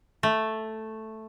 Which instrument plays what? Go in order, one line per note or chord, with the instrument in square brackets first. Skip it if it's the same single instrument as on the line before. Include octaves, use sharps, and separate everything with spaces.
[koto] A3